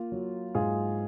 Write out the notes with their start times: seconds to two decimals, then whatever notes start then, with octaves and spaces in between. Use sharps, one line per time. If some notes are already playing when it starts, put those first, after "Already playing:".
Already playing: A#3 F4
0.12 F#3
0.55 G#2 F4 G#4